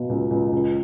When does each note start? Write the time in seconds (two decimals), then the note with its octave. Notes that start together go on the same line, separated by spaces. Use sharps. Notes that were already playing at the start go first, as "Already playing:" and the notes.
Already playing: B2 A#3
0.09 C#2
0.31 C#2
0.52 C#2